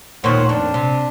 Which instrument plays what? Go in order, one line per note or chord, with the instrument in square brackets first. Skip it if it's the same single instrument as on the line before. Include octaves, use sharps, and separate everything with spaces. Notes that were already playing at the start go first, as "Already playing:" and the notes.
[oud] D#2 A#2 [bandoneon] C5 C#5 F#5
[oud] F2 [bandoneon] D4
[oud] C3